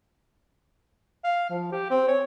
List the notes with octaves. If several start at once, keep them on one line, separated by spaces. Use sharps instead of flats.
F5
F3
G4
C4
C#5